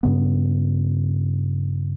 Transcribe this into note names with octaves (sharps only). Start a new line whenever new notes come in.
G2 C#3 B3